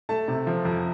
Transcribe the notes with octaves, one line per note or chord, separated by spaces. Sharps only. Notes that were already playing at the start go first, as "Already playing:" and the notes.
A3 A5
C3
F3
F2